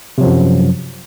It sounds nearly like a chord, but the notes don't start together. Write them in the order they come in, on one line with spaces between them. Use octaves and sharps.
C3 F#3 F3 F#2